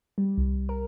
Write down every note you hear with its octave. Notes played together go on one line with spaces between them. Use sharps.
G3
C2
A#4